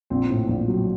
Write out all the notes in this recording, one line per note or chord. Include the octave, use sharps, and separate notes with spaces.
A#1 C4
A2
A#1
F#3